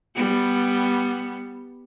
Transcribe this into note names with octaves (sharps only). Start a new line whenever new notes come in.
G3 B3